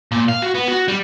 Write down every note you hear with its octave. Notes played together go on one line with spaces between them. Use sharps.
A#2
F5
F#4
B3
F#4
G3